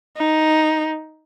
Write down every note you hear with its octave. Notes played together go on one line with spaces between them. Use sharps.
D#4